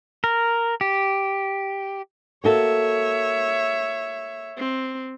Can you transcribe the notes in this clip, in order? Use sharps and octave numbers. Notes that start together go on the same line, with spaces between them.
A#4
G4
A#3 F#4 A4 C#5 E5
C4